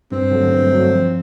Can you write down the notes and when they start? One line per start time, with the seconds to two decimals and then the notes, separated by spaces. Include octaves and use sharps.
0.12 G2 C4
0.31 D3 F#3 A3
0.51 G2
0.71 D3 F#3 A3
0.91 F3